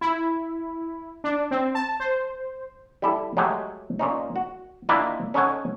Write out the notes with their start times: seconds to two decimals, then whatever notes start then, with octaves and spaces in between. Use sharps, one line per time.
0.01 E4
1.24 D4
1.51 C4
1.75 A5
2.00 C5
3.02 G3 E4 A4
3.37 F#3 G#3 A3 G4 G#4
3.99 A#2 C#4 D#4
4.36 F#4
4.89 D#3 A#3 D4 E4 F4
5.34 C#4 D#4 A4 C#5 F#5 G#5